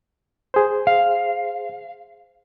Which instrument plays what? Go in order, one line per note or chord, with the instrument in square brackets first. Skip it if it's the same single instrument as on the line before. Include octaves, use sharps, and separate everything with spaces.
[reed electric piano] G#4 C5
[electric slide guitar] F5